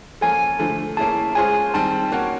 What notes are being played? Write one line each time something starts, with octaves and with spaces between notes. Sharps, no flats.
F3 A#3 C#4 F4 A4 G#5
D3 F3 A3
A#3 C#4 E4 G#4 A5
G#3 C#4 F4 G#4 C5 G#5
D#3 G3 C4 A5
A#3 C#4 F#4 A#4 C#5